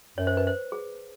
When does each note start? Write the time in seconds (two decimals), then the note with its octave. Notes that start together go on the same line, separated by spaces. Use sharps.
0.18 F#2 C#5
0.27 C5
0.37 B4
0.47 C5
0.72 G#4